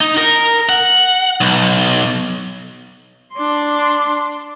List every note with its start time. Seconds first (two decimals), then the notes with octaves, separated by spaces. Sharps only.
0.01 D#4
0.18 A#4
0.69 F#5
1.41 B1
3.34 D4 C6